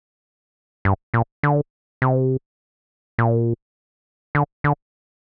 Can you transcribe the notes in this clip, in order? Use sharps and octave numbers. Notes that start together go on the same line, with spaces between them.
G2
A#2
D3
C3
A#2
D3
D3